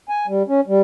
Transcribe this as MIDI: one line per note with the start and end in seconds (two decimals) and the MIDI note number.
0.09 0.26 80
0.28 0.43 55
0.48 0.61 61
0.68 0.82 55